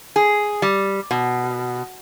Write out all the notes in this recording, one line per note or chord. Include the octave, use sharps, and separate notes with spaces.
G#4
G3
B2